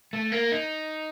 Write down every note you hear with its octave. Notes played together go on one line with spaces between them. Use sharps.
A3
A#3
D#4